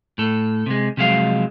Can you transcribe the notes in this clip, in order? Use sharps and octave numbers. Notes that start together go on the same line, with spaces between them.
A2 A4
C3 G#3
C3 F3 F#3 G#3 F5